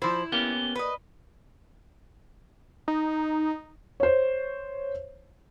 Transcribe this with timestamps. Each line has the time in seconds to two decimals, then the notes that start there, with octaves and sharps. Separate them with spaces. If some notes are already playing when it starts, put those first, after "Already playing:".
0.02 F3 E4 C5
0.32 A#3 B3 C#4 G4
0.76 B4 D#5
2.88 D#4
4.00 C5 C#5